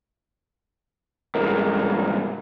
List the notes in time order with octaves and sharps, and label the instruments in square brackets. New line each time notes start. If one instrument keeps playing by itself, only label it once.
[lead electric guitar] C2 G#2 [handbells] A#4